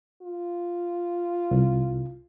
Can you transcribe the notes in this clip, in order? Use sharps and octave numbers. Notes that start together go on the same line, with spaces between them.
F4
C2